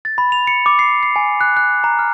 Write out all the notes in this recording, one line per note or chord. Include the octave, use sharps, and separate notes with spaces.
A6
B5
F7
C#7
D6
C7
C7
G#5
F#6
F#6
A#5
F6